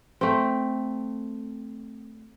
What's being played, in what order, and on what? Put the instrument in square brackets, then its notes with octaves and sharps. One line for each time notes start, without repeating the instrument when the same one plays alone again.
[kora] A3 C4